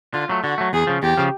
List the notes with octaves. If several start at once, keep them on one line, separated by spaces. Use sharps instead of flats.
D3 F4
F#3 A3
D3 F#4
F#3 A3
E2 G#4
C#3 F3
E2 G4
C#3 F3